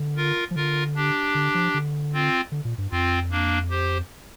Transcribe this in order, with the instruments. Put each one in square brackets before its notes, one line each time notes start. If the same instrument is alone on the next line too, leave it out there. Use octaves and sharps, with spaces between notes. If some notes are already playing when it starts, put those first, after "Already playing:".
Already playing: [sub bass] D3
[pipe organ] F4 A#4
[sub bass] F3
[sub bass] D3 [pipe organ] F4 A#4
[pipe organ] D4 G4
[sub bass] D3
F3
D3
[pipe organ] C4 F4
[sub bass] D3
A#2
G2
[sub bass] F2 [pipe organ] C4 F4
[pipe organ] A#3 D4
G4 C5